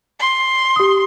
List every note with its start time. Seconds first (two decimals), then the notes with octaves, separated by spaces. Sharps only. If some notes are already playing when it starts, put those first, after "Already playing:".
0.20 C6
0.76 G4 D#6